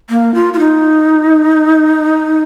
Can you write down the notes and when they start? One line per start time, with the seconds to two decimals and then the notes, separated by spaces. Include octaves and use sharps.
0.10 A#3
0.35 F4
0.54 F4
0.59 D#4